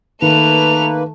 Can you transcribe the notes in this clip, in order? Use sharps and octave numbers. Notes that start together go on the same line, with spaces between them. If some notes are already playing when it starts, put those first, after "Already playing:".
D#3 A3 A#3 B4 F7